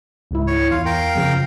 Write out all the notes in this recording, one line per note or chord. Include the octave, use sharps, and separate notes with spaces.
C#2 G#2 E4
C#5
E2 F4 F5
A#4 F5 G5
F#2 C#3 F3